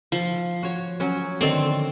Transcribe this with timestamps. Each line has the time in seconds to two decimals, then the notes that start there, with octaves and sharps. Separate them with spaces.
0.12 F3
0.63 F#4 C#5
1.00 F#3 C#4 F#4
1.41 D3 D#3 C4 A4